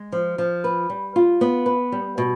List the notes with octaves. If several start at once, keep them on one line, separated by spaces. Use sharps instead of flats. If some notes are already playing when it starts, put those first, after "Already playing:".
Already playing: G#3
F3
F3
B4
G3
F4
B3
B4
G3
B2